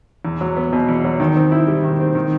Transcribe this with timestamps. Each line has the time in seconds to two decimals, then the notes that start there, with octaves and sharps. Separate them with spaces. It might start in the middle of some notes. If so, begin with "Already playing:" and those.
0.25 E2
0.41 F#3
0.57 B3
0.73 B2
0.89 E2
1.04 F#3
1.20 D#3
1.36 C4
1.52 E4
1.67 G3
1.84 D#3
2.00 C4
2.15 D#3